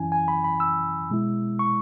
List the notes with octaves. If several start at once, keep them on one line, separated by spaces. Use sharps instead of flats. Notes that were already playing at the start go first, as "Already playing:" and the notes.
Already playing: F#2 E3 C#4 E4 G#5
G#5
B5
B5
E6
B2 G#3 E4
C#6